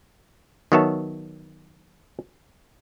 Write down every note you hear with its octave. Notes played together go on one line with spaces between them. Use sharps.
D#3 F#3 B3 C#5 E5 A5